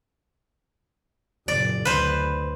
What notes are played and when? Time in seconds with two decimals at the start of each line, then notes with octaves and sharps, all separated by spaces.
1.48 F#1 A#2 D5
1.85 D2 B4 C5